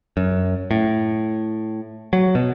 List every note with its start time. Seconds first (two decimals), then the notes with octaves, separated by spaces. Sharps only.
0.17 F#2
0.71 A2
2.13 F#3
2.35 B2